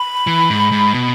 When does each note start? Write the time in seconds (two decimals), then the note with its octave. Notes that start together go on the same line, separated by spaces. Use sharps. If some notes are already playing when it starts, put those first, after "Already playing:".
Already playing: B5
0.27 E3
0.50 G#2
0.72 G#2
0.94 B2